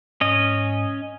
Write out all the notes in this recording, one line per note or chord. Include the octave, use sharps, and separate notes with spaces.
G#2 C#4 D#5